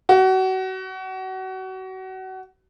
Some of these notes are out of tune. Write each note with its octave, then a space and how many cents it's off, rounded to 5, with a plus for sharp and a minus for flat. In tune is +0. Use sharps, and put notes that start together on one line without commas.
F#4 +30